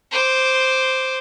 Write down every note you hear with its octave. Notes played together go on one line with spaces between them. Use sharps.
C5 D6